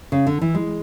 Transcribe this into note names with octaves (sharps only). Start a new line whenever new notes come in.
C#3
D3
E3
G#3